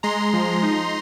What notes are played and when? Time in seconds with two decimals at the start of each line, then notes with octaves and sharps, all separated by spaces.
0.03 G#3 A#5 C6
0.33 F3
0.63 D#4